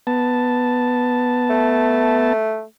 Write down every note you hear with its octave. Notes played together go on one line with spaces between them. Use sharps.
B3 A5
A3